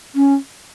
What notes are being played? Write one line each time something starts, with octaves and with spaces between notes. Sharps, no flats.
C#4